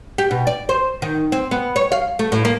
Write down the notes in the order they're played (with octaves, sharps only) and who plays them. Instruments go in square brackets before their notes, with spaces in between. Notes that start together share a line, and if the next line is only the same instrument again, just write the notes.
[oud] G4
B2
D5
C5
D#3
C4
B3
C#5
F5
A3
A2
A#3